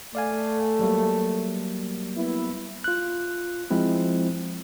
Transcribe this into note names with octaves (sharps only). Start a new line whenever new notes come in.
A3 D5 F5 G#5
F#3 G3 A#3
B3 E4
F4 F#6
F3 G#3 C4 E4